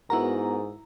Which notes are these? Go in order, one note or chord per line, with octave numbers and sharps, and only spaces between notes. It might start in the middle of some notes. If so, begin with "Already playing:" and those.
G#2 B3 E4 F#4 A#4 A#5